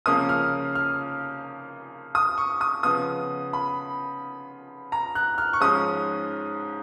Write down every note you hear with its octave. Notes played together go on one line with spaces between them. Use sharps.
C#3 F3 A#3 C#4 D#6
F6
F6
D#6
C#6
D#6
C#3 F3 B3 D#6
B5
A#5
F#6
F6
C#6
G#2 F3 G#3 C#4 D#6